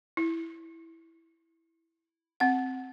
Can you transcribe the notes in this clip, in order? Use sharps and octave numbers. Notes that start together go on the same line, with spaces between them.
E4
C4 F#5